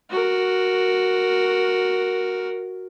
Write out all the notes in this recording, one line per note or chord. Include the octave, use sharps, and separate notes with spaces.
F#4 A#4